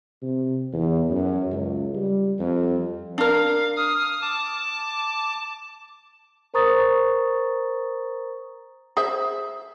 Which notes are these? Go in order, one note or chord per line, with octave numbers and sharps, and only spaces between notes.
C3
E2
F#2
C#2
G3
F2
D4 A#4 F5
D#6 F6
A5 D6
A#4 C5 A#5 C#6 D#6 A6
G#4 C5 E5